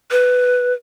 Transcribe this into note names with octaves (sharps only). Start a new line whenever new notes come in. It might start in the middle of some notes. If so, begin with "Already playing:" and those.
B4